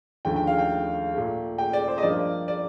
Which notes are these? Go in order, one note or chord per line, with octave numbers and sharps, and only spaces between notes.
D#2 D3 F3 A3 G5
G5
F5
G5
A#2 A3
G5
D5
C5
D#5
G2 F3 A#3 D5
D5